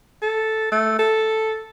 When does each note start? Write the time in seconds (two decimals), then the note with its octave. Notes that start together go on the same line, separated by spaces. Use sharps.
0.22 A4
0.72 A3
0.99 A4